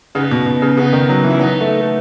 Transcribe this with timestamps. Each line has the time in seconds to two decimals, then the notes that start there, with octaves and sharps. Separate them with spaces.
0.15 C#3 B3 D#4
0.31 B2
0.46 B2
0.62 C#3
0.77 C#3 B3 D#4
0.93 D#3
1.09 F#3
1.24 E3
1.30 E4
1.39 F#3 B3 D#4
1.61 A3
1.81 A3